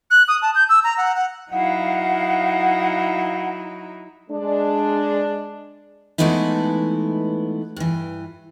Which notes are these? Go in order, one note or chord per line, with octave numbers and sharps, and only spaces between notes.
F#6
D#6
A5
G6
E6
A#5
F#5
F#5
F#3 D#4 E4 F5 F#5
G#3 D4
E3 G#3 A3 B3 D#4 E4
G2 E3